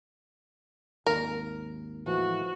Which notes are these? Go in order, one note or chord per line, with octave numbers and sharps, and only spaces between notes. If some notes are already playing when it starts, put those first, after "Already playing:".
G#1 D#2 A#4
A2 E3 F3 F#4